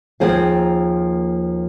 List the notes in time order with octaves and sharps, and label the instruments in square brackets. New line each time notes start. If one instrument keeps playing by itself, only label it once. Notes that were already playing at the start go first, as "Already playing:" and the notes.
[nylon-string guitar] D#2 F3 A#3 C4 G#4 F5